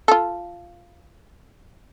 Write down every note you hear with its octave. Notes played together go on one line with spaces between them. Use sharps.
F4 A4